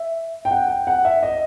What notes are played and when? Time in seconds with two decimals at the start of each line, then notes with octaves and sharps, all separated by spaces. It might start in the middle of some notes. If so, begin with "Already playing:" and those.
Already playing: E5
0.45 G5
0.51 F#5
0.68 G5
0.87 F#5
1.05 E5
1.23 D#5